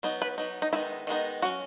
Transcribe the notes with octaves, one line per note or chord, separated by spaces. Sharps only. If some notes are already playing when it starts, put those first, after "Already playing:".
F#3 B3 D#4
B4
F#3 B3 D#4
D#4
D#3 G#3 B3 D#4 E4
D#3 G#3 B3 D#4
F#3 C#4 F#4